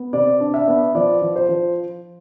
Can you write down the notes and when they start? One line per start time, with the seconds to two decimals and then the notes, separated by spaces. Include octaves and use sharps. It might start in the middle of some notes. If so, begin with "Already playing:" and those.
Already playing: B3
0.13 C3 D5
0.40 D4
0.54 E5
0.68 B3
0.95 F3 D5
1.22 F3
1.36 C5
1.49 F3